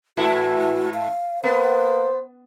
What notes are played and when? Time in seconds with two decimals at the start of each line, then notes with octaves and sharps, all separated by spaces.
0.17 G#2 E3 E4 F#4 A4
0.94 F5
1.43 A#3 B3 B4 C5